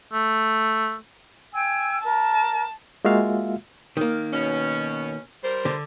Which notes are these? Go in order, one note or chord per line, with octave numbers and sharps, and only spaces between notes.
A3
G5 G#5 E6
A#4 A5
G#3 A#3 F4 F#4 E5 F5
D#3 A#3
B2 C#4
G3 A#4 C5
D3